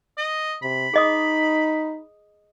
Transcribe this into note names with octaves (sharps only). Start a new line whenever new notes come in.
D#5
C3 B5
D#4 G#4 D#5 D#6